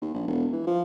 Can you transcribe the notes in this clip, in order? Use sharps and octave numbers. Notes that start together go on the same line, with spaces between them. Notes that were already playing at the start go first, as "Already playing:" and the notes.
D#2
A#1
E1
E3
F3